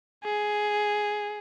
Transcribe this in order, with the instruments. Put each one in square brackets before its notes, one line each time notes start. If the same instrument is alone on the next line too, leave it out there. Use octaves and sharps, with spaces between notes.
[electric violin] G#4